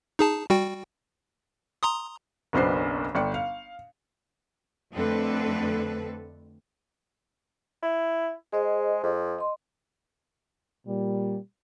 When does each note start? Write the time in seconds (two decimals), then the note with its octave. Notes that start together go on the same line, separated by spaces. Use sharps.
0.19 D#4 G#4 A5
0.50 G3 F#4 G5
1.83 A#5 C6 D#6
2.53 F#1 B1 B3 D4 C5 C7
3.15 G1 D5 G5 C#7
3.34 F5
4.94 F2 D3 A3 C4 A4 B4
7.83 E4
8.52 G#3 G#4 C5 D#5
9.03 F2
9.39 D#5 C6
10.86 A#2 G3